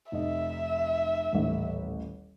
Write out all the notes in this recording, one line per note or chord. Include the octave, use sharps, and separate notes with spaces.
F1 D#5 E5
D#1 A1